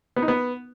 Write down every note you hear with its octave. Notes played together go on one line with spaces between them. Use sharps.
B3
D#4
B3